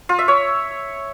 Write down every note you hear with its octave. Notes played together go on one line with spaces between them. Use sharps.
F4
E5
C#5